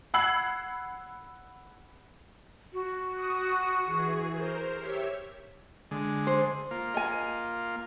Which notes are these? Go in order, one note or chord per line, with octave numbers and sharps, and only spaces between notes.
F#5 B5 E6 G#6 C7 F#7
F#4
D#6
E3 G#4
A#4 C5
G4 C#5 E5
D3 G#3
C5
A#3 F4
D#5 G#5